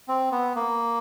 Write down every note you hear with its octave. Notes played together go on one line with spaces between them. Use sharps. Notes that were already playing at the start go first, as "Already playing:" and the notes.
C4
B3
A#3